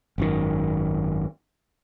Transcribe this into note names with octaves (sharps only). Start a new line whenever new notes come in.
G#1 F#2 D#3